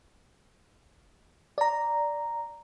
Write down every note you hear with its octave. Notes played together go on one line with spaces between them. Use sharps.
D5 A#5